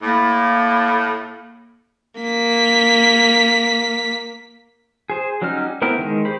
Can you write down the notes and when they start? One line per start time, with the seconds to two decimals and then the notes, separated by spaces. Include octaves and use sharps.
0.03 A2 A#3
2.21 A#3 B6
5.10 G#4 C5
5.42 F#3 G3 C#4 D#4 F6
5.82 A3 B3 C4 E4 A#4
5.99 D#3 G#3
6.25 G4 C5 B5